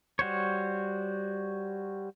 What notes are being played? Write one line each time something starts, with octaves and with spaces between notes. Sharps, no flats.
G3 F#4 C5 C#5